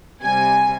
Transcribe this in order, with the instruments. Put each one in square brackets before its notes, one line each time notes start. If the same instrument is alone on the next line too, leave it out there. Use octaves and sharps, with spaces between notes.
[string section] C3 G3 G#5